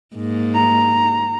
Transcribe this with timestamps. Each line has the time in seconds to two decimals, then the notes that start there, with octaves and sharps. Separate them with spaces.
0.15 G#2 A#3
0.55 A#5